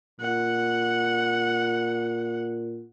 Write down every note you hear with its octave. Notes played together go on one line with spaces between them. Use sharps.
A#2 F#5